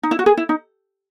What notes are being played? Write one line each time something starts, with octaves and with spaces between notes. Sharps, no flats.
D#4
E4
F#4
G#4
E4
D#4